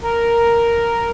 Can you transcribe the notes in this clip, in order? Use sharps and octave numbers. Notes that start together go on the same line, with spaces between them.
A#4